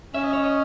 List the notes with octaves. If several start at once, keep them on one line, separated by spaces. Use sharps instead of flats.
C#4 E5
D#5
C#5
D#5